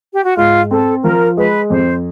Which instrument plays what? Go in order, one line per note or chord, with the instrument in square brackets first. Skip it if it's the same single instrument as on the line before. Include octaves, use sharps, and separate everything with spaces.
[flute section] G4
F#4
[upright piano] G#2 [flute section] F4
[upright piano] C4 [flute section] A4
[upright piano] F3 [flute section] A#4
[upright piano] G#3 [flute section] B4
[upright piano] F2 [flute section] C5